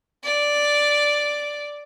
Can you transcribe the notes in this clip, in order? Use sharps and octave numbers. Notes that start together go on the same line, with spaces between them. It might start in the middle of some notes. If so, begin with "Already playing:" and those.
D5